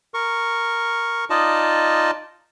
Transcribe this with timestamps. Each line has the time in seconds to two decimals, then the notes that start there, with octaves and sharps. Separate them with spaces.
0.14 A#4 C#6
1.30 D#4 F4 D5 D#5 A5